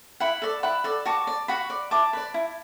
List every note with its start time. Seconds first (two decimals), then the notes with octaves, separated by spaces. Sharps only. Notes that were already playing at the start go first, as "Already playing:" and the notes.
0.20 E4 F#5 B5
0.42 A4 D5
0.63 E4 F#5 B5
0.84 A4 D5
1.05 F#4 A5 D6
1.27 D5
1.48 F#4 F#5 B5
1.70 D5
1.91 E4 A5 D6
2.13 B4 D5
2.34 E4